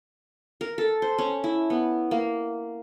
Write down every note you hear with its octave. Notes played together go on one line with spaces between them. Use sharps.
A#4
A4
C5
C#4
E4
B3
A#3